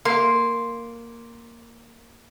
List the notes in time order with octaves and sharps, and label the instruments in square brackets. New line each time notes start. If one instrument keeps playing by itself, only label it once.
[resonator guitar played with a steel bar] A#3 [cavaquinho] C6